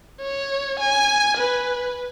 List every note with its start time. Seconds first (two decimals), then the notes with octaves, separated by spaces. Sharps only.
0.21 C#5
0.80 G#5
1.38 B4